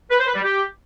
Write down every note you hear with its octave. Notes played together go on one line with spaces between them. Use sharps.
B4
C5
B4
G3
G4